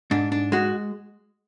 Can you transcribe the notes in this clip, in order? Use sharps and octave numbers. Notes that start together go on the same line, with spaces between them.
G#2 D4
D4
G#3 F#4